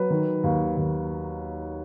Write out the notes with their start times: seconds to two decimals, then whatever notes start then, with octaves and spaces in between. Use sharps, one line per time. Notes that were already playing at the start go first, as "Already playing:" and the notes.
Already playing: F#3 B4
0.10 D#3
0.43 D#2
0.77 D#2